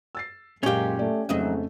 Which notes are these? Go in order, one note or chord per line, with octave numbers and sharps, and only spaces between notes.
E6 A6 C7
F#2 A#2 G#3 C#4 G4 A#4 F5
A3 D5
F2 G#2 C#3 F#3 A3 D#5 E5